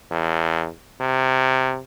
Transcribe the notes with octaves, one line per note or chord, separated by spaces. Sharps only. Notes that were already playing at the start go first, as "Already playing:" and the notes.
E2
C3